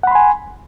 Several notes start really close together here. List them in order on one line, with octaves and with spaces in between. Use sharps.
F#5 B5 C6 G#5